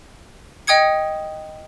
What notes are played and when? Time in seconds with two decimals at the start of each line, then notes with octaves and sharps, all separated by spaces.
0.67 D#5 G5 D#6 G#6 C#7